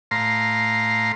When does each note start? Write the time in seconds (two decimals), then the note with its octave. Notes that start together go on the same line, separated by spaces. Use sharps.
0.11 A2 F5 A#5 C6